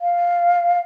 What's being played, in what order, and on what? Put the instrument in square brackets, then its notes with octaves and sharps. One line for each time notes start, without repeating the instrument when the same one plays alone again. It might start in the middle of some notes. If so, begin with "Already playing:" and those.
[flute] F5